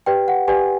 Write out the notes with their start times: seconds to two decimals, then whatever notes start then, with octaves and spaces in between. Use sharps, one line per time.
0.06 G4 B4 D5 G5
0.28 F#5
0.48 G4 B4 D5 G#5